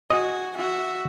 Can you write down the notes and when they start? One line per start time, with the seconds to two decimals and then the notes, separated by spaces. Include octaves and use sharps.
0.10 F#4 D#5 G#5
0.57 F#4 E5